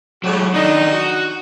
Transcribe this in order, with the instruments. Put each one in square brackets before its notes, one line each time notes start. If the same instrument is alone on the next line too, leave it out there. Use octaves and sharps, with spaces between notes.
[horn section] A2 F#4 G4 [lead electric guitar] F#3 G#3
[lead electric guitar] D#3 D4 [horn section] D#4
[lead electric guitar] F#4